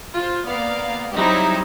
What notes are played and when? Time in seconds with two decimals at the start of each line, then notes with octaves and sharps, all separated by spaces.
0.15 F4 C5
0.46 A#3 B3 D5 F5
1.14 F#3 G3 C4 D#4 E4 G4